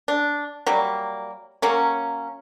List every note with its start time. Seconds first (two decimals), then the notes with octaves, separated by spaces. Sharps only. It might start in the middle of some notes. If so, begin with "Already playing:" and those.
0.08 D4
0.67 F#3 G3 A#3
1.62 F#3 A#3 C#4